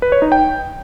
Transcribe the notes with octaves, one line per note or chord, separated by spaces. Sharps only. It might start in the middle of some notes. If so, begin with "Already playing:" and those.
B4
C#5
D#4
G5